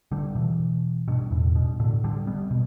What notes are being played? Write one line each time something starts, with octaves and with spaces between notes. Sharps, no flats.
D3 G3
B2 E3
G2 B2
E2 A2
G2 B2
A2 D3
D3 G3
G3 B3
B2